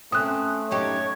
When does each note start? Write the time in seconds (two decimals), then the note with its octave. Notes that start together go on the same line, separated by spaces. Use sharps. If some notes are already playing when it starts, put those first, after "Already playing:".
0.12 A3 C4 C#4 D#6 F#6
0.71 F#2 D#4 G4 C#5